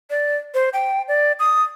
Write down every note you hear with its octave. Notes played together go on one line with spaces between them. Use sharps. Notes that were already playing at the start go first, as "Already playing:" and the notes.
D5
C5
G5
D5
D#6